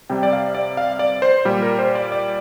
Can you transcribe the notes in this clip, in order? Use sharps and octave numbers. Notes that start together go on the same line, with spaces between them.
C3 G3 G5
D5
F5
D5
F5
D5
C5
A#2 G3
A#4
C5
D5
D5